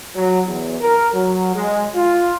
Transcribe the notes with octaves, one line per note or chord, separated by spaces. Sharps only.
F#3
E2
A#4
F#3
G#3
F4